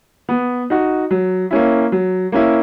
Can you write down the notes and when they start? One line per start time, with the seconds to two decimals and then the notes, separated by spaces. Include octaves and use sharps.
0.29 B3
0.70 D#4 F#4
1.11 F#3
1.51 A#3 C#4 E4
1.92 F#3
2.32 A#3 C#4 E4